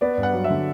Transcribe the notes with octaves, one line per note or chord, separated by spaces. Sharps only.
B3 D5
G2
F#5
F#3
E5
D3